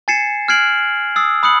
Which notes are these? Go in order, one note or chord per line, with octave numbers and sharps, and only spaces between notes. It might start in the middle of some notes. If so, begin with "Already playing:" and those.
G#5 G#6 A6 C7 C#7 E7
F6 F#6 G#6 C7 D7 F#7
D#6 E6 A6 C7
B5 D#6 F#6 C#7 F#7